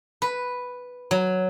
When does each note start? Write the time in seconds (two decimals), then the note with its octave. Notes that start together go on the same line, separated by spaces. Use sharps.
0.22 B4
1.11 F#3